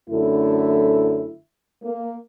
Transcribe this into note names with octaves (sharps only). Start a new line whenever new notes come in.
F#2 D3 A3 E4
A#3